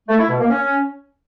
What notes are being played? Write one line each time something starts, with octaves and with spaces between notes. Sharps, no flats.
A3
E4
B2
A#3
C#4